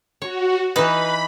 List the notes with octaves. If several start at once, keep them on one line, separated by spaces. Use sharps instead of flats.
F#4 C#5
E3 D#4 B4 B5